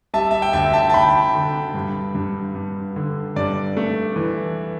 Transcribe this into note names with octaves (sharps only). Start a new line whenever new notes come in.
G3 E5 A5
E5
G5
D2 E5 A5
E5 A5
A5
D2 G5 B5
D3
G2
G2
G2
D3
G2 D5
A3
E3